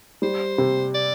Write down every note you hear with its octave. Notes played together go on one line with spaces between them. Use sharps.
G3 C5
C3
D5